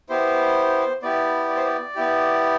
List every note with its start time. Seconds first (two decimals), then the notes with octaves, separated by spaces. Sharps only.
0.09 B3 E4 G4 C5
1.02 B3 E4 G4 D5
1.49 D5
1.57 C5
1.65 D5
1.95 B3 E4 G4